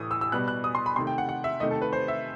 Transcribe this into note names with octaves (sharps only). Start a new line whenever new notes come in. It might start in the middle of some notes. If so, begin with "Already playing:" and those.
Already playing: A2 E3 A3 D#6
E6
E6
B2 G3 B3 F#6
F#6
D#6
C6
B5
C3 D#3 A3 C6
G5
F#5
F#5
E5
C3 D#3 A3 D#5
A4
B4
C5
E5